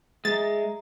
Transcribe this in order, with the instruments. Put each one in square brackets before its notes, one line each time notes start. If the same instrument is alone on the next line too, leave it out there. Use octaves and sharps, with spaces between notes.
[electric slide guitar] G#3 [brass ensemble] E5 A#5 [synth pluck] A6